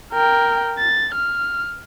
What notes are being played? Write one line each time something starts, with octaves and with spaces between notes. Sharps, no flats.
A#4 G5
A6
F6